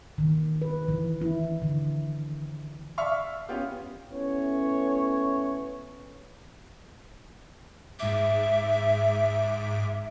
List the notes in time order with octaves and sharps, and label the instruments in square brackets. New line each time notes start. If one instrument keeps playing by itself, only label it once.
[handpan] D#3
B4
E3
E4
D3
[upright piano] D5 E5 F5 C#6 F6
B3 C#4 F4 G4
[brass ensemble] A3 B3 C#4 E4 C#5
[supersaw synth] G#2 D6 [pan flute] E5